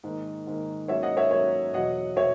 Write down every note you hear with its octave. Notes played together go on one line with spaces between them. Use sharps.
G#2 D#3 A#3
G#2 D#3 A#3
G#2 F#3 A#3 C#4 C#5 E5
D#5 F#5
C#5 E5
G#2 F#3 A#3 C#4 C#5 E5
E2 B2 F#3 D#5 F#5
B2 F#3 C#5 E5